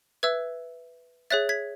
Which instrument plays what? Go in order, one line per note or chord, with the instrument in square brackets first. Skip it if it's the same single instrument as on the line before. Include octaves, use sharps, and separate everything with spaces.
[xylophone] B4 E5 E6 G#6
G#4 C#5 E5 F#6 A6
G#6 B6